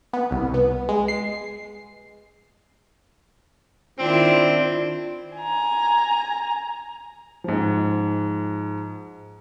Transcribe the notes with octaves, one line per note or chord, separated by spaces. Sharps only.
B3
C2
B3
G#3
C7
D#3 C4 D4 E4 F4
G#5 A#5
G#2 F3